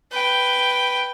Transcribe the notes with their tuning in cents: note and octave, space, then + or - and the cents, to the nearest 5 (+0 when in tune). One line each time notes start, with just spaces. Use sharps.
B4 +0 G5 +0